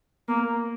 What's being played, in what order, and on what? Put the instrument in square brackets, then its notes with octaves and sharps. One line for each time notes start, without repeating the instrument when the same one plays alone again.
[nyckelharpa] A#3